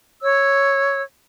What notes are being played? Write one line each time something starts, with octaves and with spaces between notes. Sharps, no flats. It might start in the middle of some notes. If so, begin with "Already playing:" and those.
C#5 E6